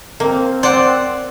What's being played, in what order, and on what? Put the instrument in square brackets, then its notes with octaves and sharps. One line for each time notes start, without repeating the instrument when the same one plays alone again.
[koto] A#3 [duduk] C4
[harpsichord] C5 F#5 [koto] D5